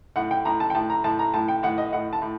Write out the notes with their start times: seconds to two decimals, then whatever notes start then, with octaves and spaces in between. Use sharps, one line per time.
0.16 A2 F#5
0.31 G5
0.45 A2 A#5
0.60 A5
0.70 G5
0.75 A2 A5
0.90 A#5
1.04 A2 A5
1.19 A#5
1.34 A2 A5
1.48 G5
1.63 A2 F#5
1.78 D#5
1.93 A2 F#5
2.13 A5
2.22 A2